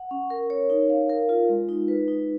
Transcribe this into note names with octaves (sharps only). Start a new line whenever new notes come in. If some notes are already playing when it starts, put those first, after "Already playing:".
Already playing: F#5
C#4
A#4
C#5
D#4
F5
A#4
F4
G#3
D#4
B4
D#4